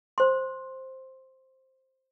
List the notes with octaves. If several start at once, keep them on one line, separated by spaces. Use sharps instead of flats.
C5 C6